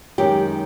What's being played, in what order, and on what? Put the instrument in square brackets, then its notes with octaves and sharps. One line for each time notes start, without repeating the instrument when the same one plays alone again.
[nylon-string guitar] F#2 D#3 G#3 G4